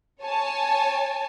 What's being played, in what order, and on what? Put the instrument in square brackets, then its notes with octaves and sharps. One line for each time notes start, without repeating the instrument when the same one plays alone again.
[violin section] C#5 G#5 A5